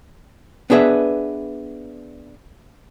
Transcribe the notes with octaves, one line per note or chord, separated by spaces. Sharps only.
B3 D4 G#4 B4 E5